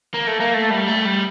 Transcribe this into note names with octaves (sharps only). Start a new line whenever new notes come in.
A#3
A3
A#3
A3
G3
A3
G3